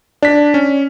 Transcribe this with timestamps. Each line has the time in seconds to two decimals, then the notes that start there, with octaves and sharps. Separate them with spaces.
0.23 D4 D5 B6
0.54 C#4